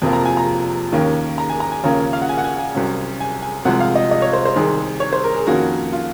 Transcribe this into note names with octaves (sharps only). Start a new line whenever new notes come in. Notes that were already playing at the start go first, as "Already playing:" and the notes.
F2 C3 F3 A#3
A#5
G#5
A#5
D#2 D#3 A#3 C#4
A#5
G#5
A#5
G#5
D#2 C#3 F3 A#3 C#4 A#5
F5
F#5
G#5
F#5
G#5
G#5
C2 C3 F#3 C#4
G#5
G#5
C2 C3 F3 G#3 F#5
F5
D#5
D#5
C#5
C5
C5
C2 C3 D#3 G#4
C#5
C5
A#4
G#4
F2 D#3 A#3 C#4 F#4
F4